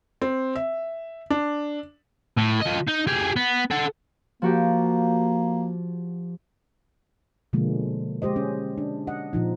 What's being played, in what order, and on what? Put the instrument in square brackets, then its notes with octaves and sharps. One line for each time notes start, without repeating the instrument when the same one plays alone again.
[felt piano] C4
E5
D4
[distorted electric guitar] A2
F3 D#5
D#4
G4 G#4
B3
A4 F#5
[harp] F3 F#4 G4 [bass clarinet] A#3
[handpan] B2 D3 F3 G#3 A#3
G#3 G4 C5 D#5
C#4
D4
D#5 F#5
A#2 F3 D#4